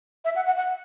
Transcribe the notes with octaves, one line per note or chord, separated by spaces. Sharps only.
E5
F#5
F#5
F#5